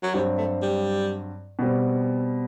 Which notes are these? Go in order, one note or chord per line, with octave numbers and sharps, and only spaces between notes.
F#3
G2 F#3 G3 C4
A3
G3
B2 G3 C4